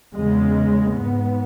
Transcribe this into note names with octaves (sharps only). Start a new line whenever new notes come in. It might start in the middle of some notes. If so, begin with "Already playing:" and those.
E2 C#3 G#3
G#2 B3